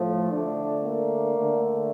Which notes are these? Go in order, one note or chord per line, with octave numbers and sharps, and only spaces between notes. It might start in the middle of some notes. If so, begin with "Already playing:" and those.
Already playing: A2 F3 A3
D3 A3 D4
A#3
D3 A3